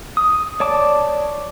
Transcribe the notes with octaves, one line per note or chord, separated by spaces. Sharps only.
D#6
C#5 D5 A5 D6